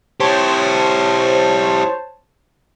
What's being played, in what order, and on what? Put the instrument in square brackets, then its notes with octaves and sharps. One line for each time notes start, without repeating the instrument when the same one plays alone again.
[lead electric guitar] E4 G4 [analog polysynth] C5 C#5 A5